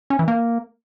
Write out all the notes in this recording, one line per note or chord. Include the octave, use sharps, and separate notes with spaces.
C#4
E3
A#3